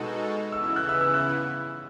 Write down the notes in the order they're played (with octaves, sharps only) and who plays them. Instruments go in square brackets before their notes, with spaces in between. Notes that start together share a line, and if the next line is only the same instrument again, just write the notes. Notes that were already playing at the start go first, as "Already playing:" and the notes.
Already playing: [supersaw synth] B2 G#3 D#4 F#4 A4
[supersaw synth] C#3 E3 B3 E4 [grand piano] E6
[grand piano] E6
F#6
E6
E6
F#6